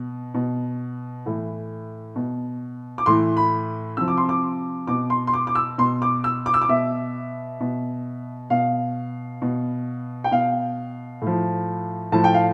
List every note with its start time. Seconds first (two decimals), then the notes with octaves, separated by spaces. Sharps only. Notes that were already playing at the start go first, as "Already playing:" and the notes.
Already playing: B2
0.34 B2
1.26 A2 E3
2.16 B2
2.98 D6
3.06 A2 E3 C6
3.37 B5
3.97 C3 F3 E6
4.08 D6
4.17 C6
4.29 D6
4.87 B2 D6
5.10 C6
5.27 C6
5.34 D6
5.47 D6
5.55 E6
5.78 B2 C6
6.02 D6
6.24 E6
6.46 D6
6.54 E6
6.61 D6
6.69 B2 E5
7.60 B2
8.50 B2 F5
9.42 B2
10.24 G5
10.31 B2 F5
11.22 A2 F3
12.12 A2 F3 A5
12.24 G5
12.34 F5